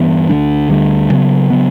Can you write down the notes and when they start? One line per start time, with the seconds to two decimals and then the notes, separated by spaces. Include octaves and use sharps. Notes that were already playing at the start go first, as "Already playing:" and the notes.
Already playing: G2 E3 B3
0.29 D2 D3 G3 D4
0.69 D2 D3 G3 D4
1.10 C#3 F#3 B3
1.50 C#3 F#3 B3